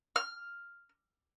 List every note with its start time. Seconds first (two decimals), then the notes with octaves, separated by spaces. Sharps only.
0.16 F6